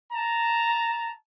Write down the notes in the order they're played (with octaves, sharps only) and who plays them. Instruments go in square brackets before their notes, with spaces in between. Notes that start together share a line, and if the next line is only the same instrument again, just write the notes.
[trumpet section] A5 A#5